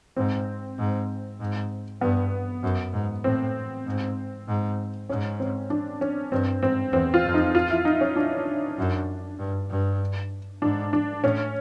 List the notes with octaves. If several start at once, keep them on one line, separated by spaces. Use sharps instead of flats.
G#2 C4
G#2
G#2
G2 B3
F#2
G#2
A2 C4
G#2
G#2
G#2 C#4
C4
D4
C#4
G2 C4
G#2 C4
E2 C4
F4
F2
D#4
F4
E4
D#4
C#4
D4
F#2
G2
G2
G#2 D4
D4
A2 C#4